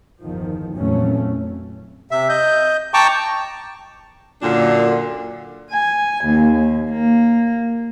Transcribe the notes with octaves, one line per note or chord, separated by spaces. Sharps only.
G1 E2 D#3 F3
F2 A#2 E3 F#3 A3 C#4
C3 E5
D#5 G6
G5 A5 A#5 C#6 D6
F#2 A#2 D3 D4
G#5
D#2
A#3